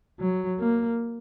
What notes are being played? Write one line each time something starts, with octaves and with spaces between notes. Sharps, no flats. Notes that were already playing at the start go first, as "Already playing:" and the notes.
F#3
A#3